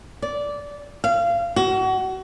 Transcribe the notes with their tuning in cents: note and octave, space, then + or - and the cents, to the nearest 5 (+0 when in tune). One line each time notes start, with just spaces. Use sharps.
D5 -15
F5 -25
F#4 +30